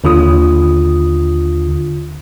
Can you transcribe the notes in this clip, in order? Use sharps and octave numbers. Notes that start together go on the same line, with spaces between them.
D#2 D3 F4 D#6